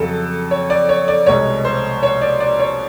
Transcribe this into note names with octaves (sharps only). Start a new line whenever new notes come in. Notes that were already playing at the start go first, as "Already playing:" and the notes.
Already playing: F2 C#3 F#3 A4
C#5
D5
C#5
D5
C2 B2 G#3 C#5
C5
C#5
D5
D5
C#5